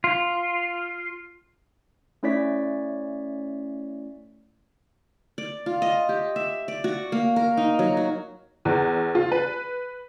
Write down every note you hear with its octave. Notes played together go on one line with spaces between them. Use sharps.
F4
A3 C#4 E4 C#5 D5 B6
D5
F4
D#5
G4
E5
D5
F#4
A#3
A#4
D#4
F#3
F#4
E2
F4
B4